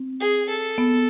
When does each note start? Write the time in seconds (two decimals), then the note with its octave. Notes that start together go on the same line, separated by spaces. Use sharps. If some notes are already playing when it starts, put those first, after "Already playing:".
Already playing: C4
0.21 G#4
0.49 A4
0.78 B3